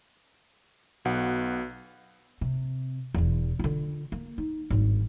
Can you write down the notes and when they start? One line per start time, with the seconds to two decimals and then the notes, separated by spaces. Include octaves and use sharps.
1.05 B1 B2 F#5
2.41 C3
3.14 E1 E2
3.59 D3 F4
4.12 A#3
4.38 D#4
4.70 G#1 G2